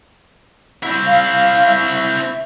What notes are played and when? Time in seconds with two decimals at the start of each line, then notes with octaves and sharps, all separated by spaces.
0.83 C4 E4
1.06 F5
1.66 E5